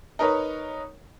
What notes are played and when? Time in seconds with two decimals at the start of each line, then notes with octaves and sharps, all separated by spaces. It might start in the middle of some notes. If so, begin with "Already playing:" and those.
0.19 D#4 A#4 B4 C#5